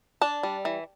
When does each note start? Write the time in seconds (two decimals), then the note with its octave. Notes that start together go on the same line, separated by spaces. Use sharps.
0.21 D4 A5
0.43 G3
0.65 E3